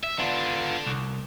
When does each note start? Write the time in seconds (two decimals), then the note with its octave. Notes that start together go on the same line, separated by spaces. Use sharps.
0.04 E5
0.19 D3 B3 D4 F4
0.86 C2